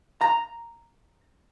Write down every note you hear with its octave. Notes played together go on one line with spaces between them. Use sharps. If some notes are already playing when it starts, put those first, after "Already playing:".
A#5